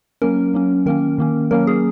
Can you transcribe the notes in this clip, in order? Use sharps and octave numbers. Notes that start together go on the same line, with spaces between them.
F#3 A#3 C#4 A#4
F#3 A#3 C#4
D#3 A#3 C#4 A#4
D#3 A#3 C#4
F#3 A#3 C#4 A#4
G#4